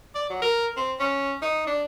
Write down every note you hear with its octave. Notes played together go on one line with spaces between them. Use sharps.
D5
F#3
A#4
C4
C#4
D#4
D4